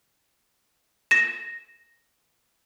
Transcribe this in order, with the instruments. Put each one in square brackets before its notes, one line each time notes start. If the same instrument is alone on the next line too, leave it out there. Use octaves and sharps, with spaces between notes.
[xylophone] A#6 E7